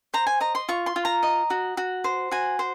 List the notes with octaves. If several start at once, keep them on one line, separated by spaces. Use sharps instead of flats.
C5 A#5
G#5
D#5 A#5
C6
F4 C#6
C6
F4
A#5
D#5
F#4
F#4
C5
F#4 G#5
C5